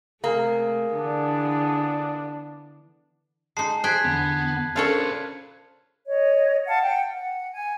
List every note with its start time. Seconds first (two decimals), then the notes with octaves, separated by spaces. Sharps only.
0.24 C3 A3 A#3 G#4
0.94 D3 E3 B3 D4
3.57 G#3 D#4 A5 C7
3.84 G#4 C5 G5 F#6 G#6 B6
4.04 E2 D3 B3
4.76 C#4 D4 F4 A4 A#4 C5 C#5
6.06 C#5 D#5
6.66 F5 F#5 A5
6.82 F#5 G5
7.12 F#5
7.51 G#5